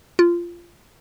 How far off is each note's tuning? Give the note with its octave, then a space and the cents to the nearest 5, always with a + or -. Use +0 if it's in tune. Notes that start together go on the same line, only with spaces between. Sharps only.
F4 -15